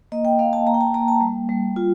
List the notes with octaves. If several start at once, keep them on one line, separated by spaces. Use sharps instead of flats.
A#3 D#5
G5
A#3 F5
A5
A#3 A#5
G5
A5
A#3 A#5
A5
G3
G3
F4